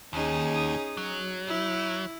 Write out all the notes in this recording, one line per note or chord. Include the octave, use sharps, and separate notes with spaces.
D#2 C#4 D#4 G#4
F#3
E4